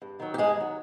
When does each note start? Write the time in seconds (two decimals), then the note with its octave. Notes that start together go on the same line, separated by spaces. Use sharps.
0.02 G2
0.20 D#3 F#3
0.34 G4
0.38 G2 G#3 G#4
0.57 D#3 F#3